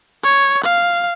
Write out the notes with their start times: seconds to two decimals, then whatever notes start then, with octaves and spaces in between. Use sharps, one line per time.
0.23 C#5
0.64 F5